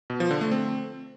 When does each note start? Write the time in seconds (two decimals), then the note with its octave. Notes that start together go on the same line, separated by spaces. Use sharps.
0.10 B2
0.20 F3
0.31 D3
0.41 A3
0.52 C4